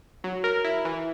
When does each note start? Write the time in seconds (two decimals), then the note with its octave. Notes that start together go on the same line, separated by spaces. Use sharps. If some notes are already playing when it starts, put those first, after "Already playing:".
0.24 F#3
0.44 A#4
0.65 E4
0.85 E3